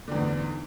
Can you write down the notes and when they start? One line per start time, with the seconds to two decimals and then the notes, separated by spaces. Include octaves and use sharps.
0.08 D3
0.12 E2
0.16 G#2